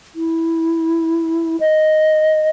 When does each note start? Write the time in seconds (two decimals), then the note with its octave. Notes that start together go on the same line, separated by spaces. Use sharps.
0.15 E4
1.60 D#5